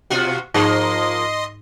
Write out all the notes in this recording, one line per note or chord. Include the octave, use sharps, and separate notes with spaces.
B2 F4 F#4
G#2 F3 A#3 D#4 G#4 D#5 C6